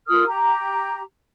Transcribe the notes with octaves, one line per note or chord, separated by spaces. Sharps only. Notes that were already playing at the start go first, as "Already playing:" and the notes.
F4 A#4 D#6 F6
G4 A#5